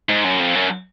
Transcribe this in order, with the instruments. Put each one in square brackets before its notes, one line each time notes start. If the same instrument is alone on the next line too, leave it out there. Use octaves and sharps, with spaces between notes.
[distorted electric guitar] G#2
F#2
F2
F#2